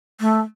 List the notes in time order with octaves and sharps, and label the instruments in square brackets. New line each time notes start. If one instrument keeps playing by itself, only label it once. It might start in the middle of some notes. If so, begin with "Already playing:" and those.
[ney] A3